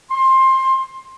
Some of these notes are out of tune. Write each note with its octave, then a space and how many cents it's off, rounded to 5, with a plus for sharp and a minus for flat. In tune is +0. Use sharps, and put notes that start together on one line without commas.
C6 +20